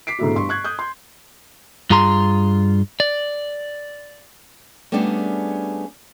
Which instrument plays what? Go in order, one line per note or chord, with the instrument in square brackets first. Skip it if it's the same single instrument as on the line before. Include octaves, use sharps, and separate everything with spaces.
[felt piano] D6 B6 C7 D7
G#2 B2 D3 A3 E4 F#4
G2 C6 C#6
C#6 F#6 G#6
D#6 F#6 G6
C6
[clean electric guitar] G2 F4 G#4 A#5 C6
D5
[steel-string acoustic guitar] G3 A3 B3 C#4 D4 G#4